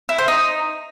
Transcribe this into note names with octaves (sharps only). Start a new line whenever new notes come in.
E4
C5
D#4